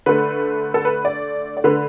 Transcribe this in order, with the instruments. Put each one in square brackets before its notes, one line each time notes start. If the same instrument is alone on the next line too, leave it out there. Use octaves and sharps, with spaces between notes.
[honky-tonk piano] D3 A3 B4
A4
B4
D5
D5
D3 A3 B4